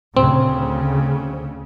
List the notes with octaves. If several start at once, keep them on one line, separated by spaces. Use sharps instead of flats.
D2 C#3 C4